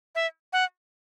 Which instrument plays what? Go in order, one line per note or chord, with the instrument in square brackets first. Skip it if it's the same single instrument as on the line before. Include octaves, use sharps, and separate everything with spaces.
[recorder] E5
F#5